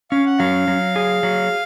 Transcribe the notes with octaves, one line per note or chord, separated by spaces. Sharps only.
C#4 F5
F#5
F#3 F5
F#3
G#4
F#3